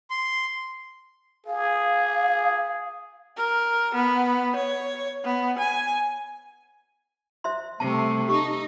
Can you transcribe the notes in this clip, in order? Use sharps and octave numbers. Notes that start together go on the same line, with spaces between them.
C6
G#4 F5
A#4
B3
C#5
B3
G#5
C5 E5 C6
C3 G3 A3 A5
D#4 G4 C#6